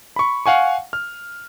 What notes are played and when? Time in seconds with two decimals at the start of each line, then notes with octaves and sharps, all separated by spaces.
0.16 B5 C#6
0.46 F5 F#5 G#5 C#6
0.93 F6